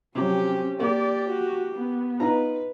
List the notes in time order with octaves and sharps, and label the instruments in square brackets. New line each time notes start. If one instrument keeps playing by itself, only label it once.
[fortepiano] C3 F3 F#3 [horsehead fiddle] C4 C#4 [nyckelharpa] G4
[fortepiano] A#3 [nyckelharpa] G4 [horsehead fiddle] D5
[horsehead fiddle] F#4
B3
[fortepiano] D#4 F4 A#5 [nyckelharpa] B4